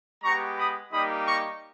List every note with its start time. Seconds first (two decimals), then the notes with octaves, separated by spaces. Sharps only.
0.23 G#3 B3 G4 A#5 C#6
0.58 B5 D#6
0.92 G3 A#3 D#4 G4 B5 D#6
1.27 A#5 C#6